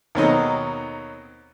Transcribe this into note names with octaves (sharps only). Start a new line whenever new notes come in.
D#2 B2 F#3 C4 D#4 A4